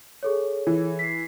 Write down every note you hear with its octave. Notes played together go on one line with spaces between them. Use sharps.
G#4 A4 C#5
E3
B6 C7